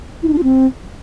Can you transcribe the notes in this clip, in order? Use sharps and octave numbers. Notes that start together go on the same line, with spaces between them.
E4
D#4
D4
F4
C4